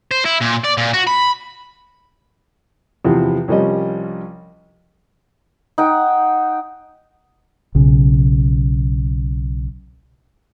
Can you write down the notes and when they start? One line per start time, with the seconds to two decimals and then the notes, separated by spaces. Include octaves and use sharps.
0.11 C5
0.25 E4
0.41 A#2
0.64 D5
0.77 A#2
0.94 F#4
1.07 B5
3.05 E2 C3 E3 F3
3.48 C2 F3 G3 C#4 D#5
5.78 D#4 F#5 G5
7.75 B1 C#3